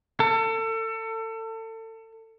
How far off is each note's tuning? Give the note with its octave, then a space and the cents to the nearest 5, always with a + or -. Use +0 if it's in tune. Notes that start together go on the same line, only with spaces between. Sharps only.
A4 +30